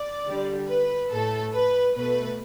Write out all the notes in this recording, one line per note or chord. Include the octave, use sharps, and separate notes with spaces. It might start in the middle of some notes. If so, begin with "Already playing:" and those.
Already playing: D5
D3 G3
B4
A2 A3 A4
B4
B2 A3 B4